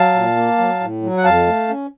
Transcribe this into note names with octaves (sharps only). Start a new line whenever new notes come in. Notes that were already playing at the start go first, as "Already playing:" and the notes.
Already playing: F#3 F5 A5
A#2
A#3
F#3
A2
F#3
F#5
F2 F5 A5
A3
C#4